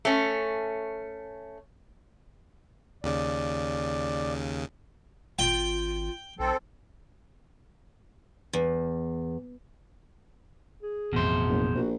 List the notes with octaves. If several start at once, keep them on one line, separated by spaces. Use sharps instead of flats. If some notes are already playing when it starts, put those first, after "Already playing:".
A3 C#4
D#2 C#3 D5
G#1 F4 G5
B1 C4 A4
E2
G#4
A1 F2 B2 C5
F#1
A#1 F#4